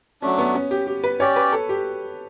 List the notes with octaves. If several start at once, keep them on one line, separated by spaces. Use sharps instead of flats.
F#3 A3 C#4 D4
B3
C#4
G4
G4
B4
C#4 G4 C#5 D5
B4
A4
G4